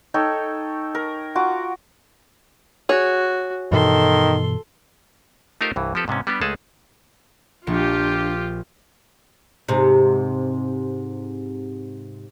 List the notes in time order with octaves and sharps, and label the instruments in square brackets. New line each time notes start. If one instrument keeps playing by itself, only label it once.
[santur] D#4 A4 C#5 G5
A#4
F4 F#4 A#5 D6
[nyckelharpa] F#4 [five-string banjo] G#4 C#5
[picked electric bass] G2 B2 E3 [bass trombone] D#3 [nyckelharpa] A4 C6
[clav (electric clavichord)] A3 D#4 F4 G4 A#4 C5
C2 G2 E3
F3 C4 G4 A4 B4
G#2 C3 B3 C#4
G3 B3 D4 G4
C#2 G#3 A3 G#4 A4 A5
[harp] A#1 C#7 [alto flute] D4 [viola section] F4 G4
[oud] G#2 C3